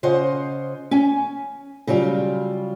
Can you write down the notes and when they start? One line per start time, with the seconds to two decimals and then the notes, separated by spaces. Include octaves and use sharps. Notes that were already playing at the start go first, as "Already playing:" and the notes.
0.03 C#3 F4 C5 D#5 F#5
0.91 C#4 G#5
1.87 C#3 F#3 G3 F4